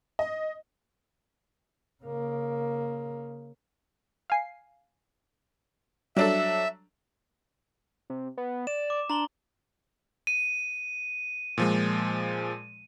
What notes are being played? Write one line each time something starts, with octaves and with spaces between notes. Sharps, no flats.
D#5
C#3 A#3
F5 G#5 C7
F#3 G3 D4 A4 E5
C3
B3
D5 E7
D6
D4 A#5 C6 G7
D#7
A#2 F3 G#3